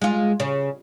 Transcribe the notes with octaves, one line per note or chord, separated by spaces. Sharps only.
G#3 F4
C#3